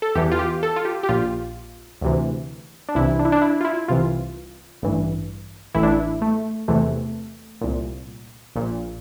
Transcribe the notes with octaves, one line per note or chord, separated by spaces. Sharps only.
A4
E2 E3 G4
F4
G4
A4
F4
G4
G4
A#1 A#2 F4
D2 C3 E3
D4
C2 C3 E3 E4
D4
E4
D4
E4
F4
E4
C2 C3 E3 F4
A1 G2 E3
A1 A2 E3 E4
D4
E4
A3
E2 C3 E3 A3
C2 A#2
A#1 A#2